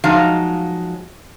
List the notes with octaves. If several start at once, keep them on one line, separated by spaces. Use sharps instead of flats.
F3 F#3 G#3 D#4 F5